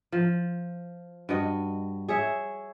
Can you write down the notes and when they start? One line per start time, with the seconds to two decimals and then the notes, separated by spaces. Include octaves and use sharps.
0.12 F3
1.29 G2 F#4 D#5
2.09 G#4 C#5 E5